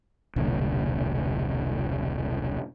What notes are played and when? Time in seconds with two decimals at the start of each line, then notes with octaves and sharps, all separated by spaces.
0.36 E1 C2 A#2 D3